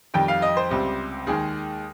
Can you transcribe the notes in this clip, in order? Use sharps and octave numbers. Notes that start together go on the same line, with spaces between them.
F2 D#3 G3 G5
F5
D#5
C5
C#2 C3 G3
D#2 D#3 G#3 G#4